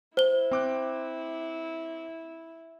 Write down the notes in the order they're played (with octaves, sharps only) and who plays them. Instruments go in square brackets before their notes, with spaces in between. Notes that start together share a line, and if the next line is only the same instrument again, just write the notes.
[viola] E4 [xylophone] C5 G7
[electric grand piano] C4 D6 F#6